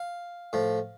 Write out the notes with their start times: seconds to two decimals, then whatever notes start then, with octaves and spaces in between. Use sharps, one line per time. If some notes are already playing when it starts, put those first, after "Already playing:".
Already playing: F5
0.53 A2 F3